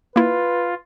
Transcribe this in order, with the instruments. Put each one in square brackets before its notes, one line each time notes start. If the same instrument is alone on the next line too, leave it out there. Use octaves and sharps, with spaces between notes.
[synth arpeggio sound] A#3 E4 [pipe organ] F4 [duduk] B4